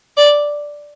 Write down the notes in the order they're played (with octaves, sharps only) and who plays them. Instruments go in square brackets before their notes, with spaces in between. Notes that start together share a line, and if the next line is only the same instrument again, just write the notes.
[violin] D5